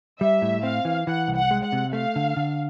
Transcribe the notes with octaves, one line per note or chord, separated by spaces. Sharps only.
G3 E5
A2
C4 F5
E3
E3 F#5
C2
F#5
G#3
F#5
C3
A3 F5
D3
D3